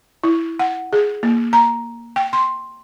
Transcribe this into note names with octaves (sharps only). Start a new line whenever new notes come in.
E4
F#5
G#4
A#3
A#5
G5
C6